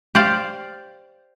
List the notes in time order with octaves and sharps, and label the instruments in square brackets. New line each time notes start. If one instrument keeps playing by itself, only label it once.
[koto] G4 C5 D5 F5